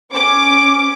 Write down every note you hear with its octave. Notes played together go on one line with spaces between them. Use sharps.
C#4 D6